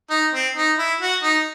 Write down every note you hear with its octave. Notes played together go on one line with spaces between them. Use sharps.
D#4
C4
D#4
E4
F#4
D#4